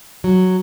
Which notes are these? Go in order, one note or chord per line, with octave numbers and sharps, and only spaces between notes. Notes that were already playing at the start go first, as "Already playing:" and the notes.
F#3